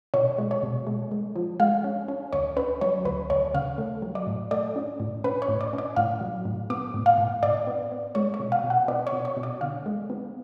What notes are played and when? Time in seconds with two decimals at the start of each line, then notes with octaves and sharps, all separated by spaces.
0.14 B2 C#5
0.38 G#3
0.51 C#5
0.63 B2
0.87 G#3
1.12 G#3
1.36 F3
1.60 G#3 F5
1.84 C#4
2.08 C#4
2.33 D2 C#5
2.57 C#4 B4
2.81 F#3 C#5
3.05 D2 B4
3.30 D2 C#5
3.54 C#3 F5
3.78 A3
4.02 F#3
4.15 D5
4.27 A2
4.51 A3 D5
4.76 C#4
5.00 A2
5.24 C#4 B4
5.42 C#5
5.48 A2
5.61 D5
5.73 C#4
5.78 D5
5.96 A2 F5
6.21 F#3
6.45 A2
6.70 B3 D6
6.94 A2
7.06 F5
7.18 A2
7.43 A2 D5
7.67 B3
7.92 B3
8.15 G#3 C#5
8.34 C#5
8.40 B2
8.52 F5
8.64 B2
8.70 F#5
8.88 B3 D5
9.07 C#5
9.12 B2
9.25 C#5
9.37 B2
9.43 D5
9.61 D3 F5
9.86 G#3
10.10 B3